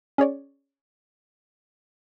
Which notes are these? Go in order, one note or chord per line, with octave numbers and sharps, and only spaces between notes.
C#4 G#4 C#5 D5